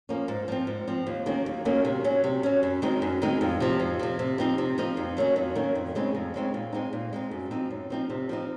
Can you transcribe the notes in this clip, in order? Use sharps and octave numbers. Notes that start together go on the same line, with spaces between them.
F3 A#3 C#4
G#2
F3 C4
G#2
F3 C4
D#2
D#3 F#3 A#3 C#4
D#2
D#3 F#3 A#3 C#4
C3
F#3 C#4
C3
F#3 C#4
F#2
D#3 G#3 C4 D#4
F#2
D#3 G#3 C4 D#4
F2
C3 F3
F2
C3 F3
C3
F3 C4 D#4
C3
F3 C4 D#4
F2
D#3 F#3 A#3 C#4
F2
D#3 F#3 A#3 C#4
F2
C#3 G#3 C4 D#4
F2
C#3 G#3 C4 D#4
A#2
G#3 C4 D#4
A#2
G#3 C4 D#4
F#2
F3 C4 D#4
F#2
F3 C4 D#4
C3
F3 C4 D#4